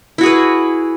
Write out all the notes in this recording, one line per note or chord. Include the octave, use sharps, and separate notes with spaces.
E4 F#4 G#4 B4